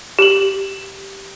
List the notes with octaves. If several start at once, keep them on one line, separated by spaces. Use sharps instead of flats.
G4 F#7